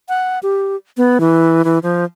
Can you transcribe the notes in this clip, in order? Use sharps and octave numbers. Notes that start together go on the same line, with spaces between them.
F#5
G4
B3
E3
E3
F3